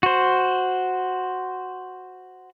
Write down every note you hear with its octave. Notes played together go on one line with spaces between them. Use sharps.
F#4 C5